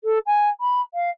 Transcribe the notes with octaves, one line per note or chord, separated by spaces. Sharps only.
A4
G#5
B5
F5